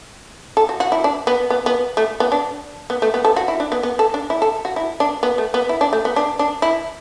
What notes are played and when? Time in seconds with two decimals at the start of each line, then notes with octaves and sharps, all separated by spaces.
0.57 A4
0.69 F#4
0.80 F#4
0.92 E4
1.04 D4
1.27 B3
1.50 B3
1.66 B3
1.97 A3
2.20 B3
2.32 D4
2.90 B3
3.02 A3
3.14 B3
3.25 A4
3.36 F#4
3.48 E4
3.60 D4
3.72 B3
3.83 B3
3.99 A4
4.14 D4
4.30 E4
4.42 A4
4.65 F#4
4.76 E4
5.00 D4
5.23 B3
5.38 A3
5.54 B3
5.69 E4
5.81 D4
5.93 A3
6.05 B3
6.16 D4
6.39 D4
6.62 E4